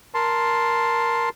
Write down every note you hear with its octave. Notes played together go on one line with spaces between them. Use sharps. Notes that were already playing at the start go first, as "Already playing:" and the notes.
A#4 A5 C6